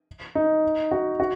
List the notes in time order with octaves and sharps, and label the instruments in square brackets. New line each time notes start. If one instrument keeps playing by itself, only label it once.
[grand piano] D#4
F#4
F#4